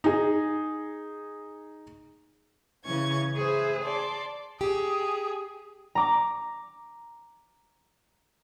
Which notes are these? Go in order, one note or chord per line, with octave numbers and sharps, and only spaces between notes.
D#4 G#4
C#3 E3 C#4 C#6 G#6
G#4 B4 C5 E5
D5 A5 C6
G4 G#4
A#5 D6